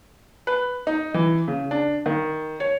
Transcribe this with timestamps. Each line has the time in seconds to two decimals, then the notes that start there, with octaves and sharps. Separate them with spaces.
0.47 B4
0.87 D#4
1.14 E3
1.48 C#3
1.71 D4
2.06 D#3
2.60 C#5